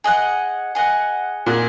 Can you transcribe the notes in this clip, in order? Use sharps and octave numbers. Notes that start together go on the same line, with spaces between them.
G#4 D#5 F#5
G#4 D#5 F#5
A#2 G#4 D#5 F#5